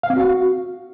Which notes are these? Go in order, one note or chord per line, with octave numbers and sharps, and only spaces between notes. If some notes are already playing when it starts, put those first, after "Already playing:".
F5
C4
F#4